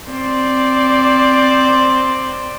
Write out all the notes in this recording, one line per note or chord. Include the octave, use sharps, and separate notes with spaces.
C4 D5